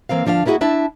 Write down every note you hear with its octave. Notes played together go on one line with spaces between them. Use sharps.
E3 A#3 C4 F5
D2 F3 D4 D#5 F5
A#3 B3 E4 F#4 G#4 D#5
D4 E4 E5 A5